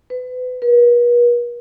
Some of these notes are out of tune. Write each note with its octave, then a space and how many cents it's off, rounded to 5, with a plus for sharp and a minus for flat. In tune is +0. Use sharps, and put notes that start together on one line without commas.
B4 +30
B4 -45